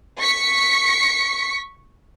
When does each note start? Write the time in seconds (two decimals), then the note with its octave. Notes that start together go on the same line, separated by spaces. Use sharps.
0.19 C#6 B6 C#7